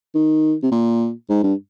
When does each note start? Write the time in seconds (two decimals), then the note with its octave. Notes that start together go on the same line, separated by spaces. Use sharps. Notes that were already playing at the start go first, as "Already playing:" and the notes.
0.15 D#3
0.62 C3
0.72 A#2
1.29 G#2
1.44 G2